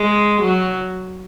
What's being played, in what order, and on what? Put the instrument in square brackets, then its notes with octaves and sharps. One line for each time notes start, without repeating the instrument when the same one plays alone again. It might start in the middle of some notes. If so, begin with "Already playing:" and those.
Already playing: [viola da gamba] G#3
F#3